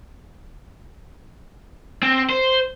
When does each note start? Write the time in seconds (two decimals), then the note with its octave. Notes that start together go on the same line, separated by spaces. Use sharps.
2.03 C4
2.30 C5